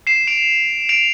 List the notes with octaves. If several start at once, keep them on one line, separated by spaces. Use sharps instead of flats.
C7 E7
D7 F7
D7 F7